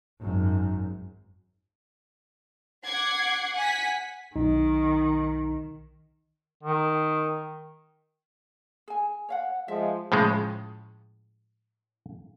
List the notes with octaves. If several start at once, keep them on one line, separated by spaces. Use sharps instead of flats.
G#1 F#2
F#5 D6 G#6 C7
F#5 G#5 B6
B1 D#3 D#4
D#3
G#4 G#5
C#5 F5 F#5
F3 G#3 E5
A2 C#3 F3 G#3